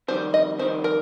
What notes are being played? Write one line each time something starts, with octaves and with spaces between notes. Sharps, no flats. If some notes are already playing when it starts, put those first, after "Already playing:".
F2 D#3 G3 C5
D#5
F2 D#3 G3 C5
A#4